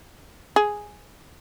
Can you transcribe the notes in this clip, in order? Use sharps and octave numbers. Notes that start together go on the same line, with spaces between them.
G#4